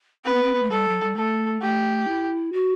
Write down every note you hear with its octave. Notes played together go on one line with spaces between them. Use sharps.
C4 B4
B3
C4
B3
A3
G3 A4
F#3
G3
A3 A4
A3 G4
E4
F#4